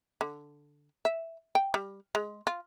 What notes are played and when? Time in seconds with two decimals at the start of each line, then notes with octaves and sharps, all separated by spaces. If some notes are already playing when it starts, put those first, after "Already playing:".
0.21 D3
1.05 E5
1.55 G5
1.74 G3
2.15 G#3
2.47 F4